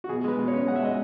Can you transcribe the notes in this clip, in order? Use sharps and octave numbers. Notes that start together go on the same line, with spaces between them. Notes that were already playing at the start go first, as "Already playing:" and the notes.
F#4
B2 G#4
G#3 B4
B2
C#5
C#4
G#3 F#5
E5
G#3 D#5